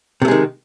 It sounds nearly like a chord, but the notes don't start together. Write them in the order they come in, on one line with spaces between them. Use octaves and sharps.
C3 A3 G#3 D#3